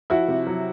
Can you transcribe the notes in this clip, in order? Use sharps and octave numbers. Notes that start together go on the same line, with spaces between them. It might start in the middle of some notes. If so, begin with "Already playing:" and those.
F3 E4 F#4
C3
F#3